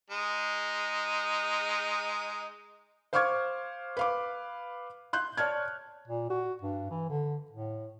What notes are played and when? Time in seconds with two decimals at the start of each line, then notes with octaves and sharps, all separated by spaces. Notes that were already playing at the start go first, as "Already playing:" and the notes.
0.10 G#3 D#4
3.13 C5 F5 C#6 D6 F6 G#6
3.97 B4 F5 D6
5.13 C6 F#6 G6
5.37 C#5 D5 A5 F6 G#6
6.08 A#2
6.29 F#4
6.62 G2
6.90 E3
7.09 D3
7.50 A2